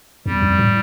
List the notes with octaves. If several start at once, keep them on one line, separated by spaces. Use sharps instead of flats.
E2 G3
F2
A2